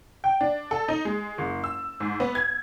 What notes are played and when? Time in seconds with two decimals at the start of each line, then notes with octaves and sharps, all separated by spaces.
0.24 G5
0.41 D4
0.71 A4
0.88 D#4
1.05 G#3
1.38 F#1
1.64 E6
2.00 G#2
2.20 B3
2.35 G#6